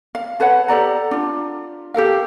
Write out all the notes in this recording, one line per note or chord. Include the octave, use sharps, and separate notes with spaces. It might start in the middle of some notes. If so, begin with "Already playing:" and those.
F5
A4 B4 C#5 F#5
G4 A4 D5 A#5
D4 F4
G4 A4 A#4 F5